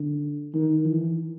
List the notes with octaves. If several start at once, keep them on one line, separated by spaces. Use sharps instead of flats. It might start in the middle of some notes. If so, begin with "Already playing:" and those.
Already playing: D3
D#3
E3